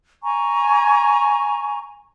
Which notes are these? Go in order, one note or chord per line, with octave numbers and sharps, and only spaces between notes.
G#5 A#5 C#6